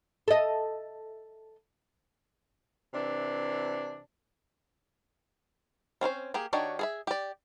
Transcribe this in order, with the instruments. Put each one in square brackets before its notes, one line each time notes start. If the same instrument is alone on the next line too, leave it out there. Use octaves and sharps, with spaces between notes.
[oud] A4 D#5
[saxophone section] C3 E3 D4
[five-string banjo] C4 C#4 A#4 C5
A#3 G4 G#4
D#3 D4 F#4 G4 C#5
G#4 A4 E5
G4 D5